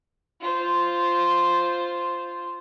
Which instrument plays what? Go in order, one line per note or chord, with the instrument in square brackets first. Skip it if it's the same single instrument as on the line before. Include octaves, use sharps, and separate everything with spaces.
[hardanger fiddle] F4 C5